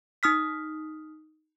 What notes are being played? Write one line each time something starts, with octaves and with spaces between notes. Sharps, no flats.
D#4 D#6 F6 B6